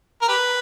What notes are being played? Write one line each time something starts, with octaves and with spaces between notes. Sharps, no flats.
A#4
G4 B4